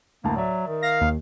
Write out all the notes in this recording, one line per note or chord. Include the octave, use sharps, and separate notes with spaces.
D2 A2 A#3 A5
F#3 D5 E5
D#3
F5 A#6
D#2